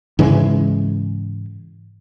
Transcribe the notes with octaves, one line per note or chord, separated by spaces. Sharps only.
G#2 C#3 E3 G#3